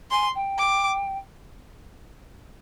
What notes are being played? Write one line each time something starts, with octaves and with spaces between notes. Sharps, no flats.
G#5 C6
G5
D6